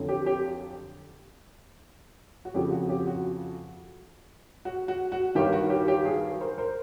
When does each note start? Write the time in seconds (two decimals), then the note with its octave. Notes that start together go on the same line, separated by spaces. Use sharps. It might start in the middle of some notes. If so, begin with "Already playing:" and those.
Already playing: F2 D3 F#3
0.08 G4
0.26 G4
2.45 F#4
2.54 F2 C#3 F3 G4
2.72 F#4
2.89 G4
3.07 F#4
4.65 F#4
4.88 F#4
5.12 F#4
5.35 G2 D#3 F#3 G4
5.53 F#4
5.70 G4
5.88 G4
6.05 F#4 G#4
6.41 A#4 C5
6.58 A#4 C5